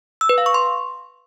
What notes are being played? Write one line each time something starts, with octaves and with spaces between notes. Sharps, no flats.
E6
B4
F5
C#6
C6